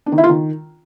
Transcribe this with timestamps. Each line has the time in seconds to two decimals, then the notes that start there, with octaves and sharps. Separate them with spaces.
0.06 D4
0.12 D#3
0.18 E4
0.24 F4
0.29 D#3